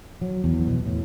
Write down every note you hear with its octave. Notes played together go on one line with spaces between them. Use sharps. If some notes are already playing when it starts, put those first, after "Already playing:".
F#3
E2
B2
A2